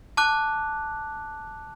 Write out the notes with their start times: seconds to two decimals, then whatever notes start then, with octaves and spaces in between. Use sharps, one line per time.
0.17 A5 D6 F#6